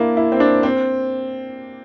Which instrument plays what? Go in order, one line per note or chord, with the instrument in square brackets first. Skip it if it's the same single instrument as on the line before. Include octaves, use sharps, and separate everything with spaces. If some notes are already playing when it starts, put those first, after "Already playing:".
Already playing: [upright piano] A#3 D4 E4
E4
C4
D4
C4